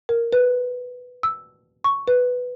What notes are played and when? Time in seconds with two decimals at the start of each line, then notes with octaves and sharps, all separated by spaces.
0.09 A#4
0.33 B4
1.23 E6
1.84 C#6
2.08 B4